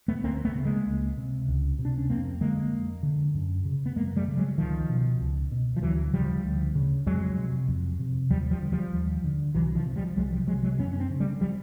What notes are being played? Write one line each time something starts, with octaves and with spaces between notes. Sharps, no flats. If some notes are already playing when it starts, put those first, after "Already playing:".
A3 B3
D2 A#3 C4
A3 B3
C#3
G#3 A#3
C#2
C3
C#2
C3
D4
C#4
F2 A#3 C4
D3 G#3 A#3
F2
D3
F#2
C#3
B3
F#2 G#3 A#3
G3 A3
C#3
F#3 G#3
C#2 D#3 F3
B2
C#2
B2
F3
D2 E3 F#3
C#3 F3 G3
D2
C#3
F2 F#3 G#3
C3
F2
C3
D#2 F3 G3
F3 G3
D3
F3 G3
D#2
D3
C2 E3 F#3
D#3 F3
C3
F3 G3
C2 F#3 G#3
F3 G3
C3 F#3 G#3
F#3 G#3
F#2 B3 C#4
C#4
C4 D4
C#3
G3 A3
F3 G3